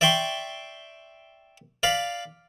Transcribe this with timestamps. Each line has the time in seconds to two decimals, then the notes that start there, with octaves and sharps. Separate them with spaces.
0.01 D5 E5 G5 C6 C#6
1.83 D5 F5 B5